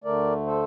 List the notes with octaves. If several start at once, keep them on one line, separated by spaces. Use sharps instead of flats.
D2 D3 A3 A#4 D5
A4 C5